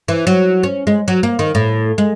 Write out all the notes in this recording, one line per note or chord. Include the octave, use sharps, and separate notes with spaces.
E3
F#3
C#4
G#3
F#3
A#3
D#3
A2
G#3